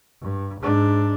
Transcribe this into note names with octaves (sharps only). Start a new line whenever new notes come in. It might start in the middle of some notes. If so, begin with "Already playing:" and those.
G2
G#2 D4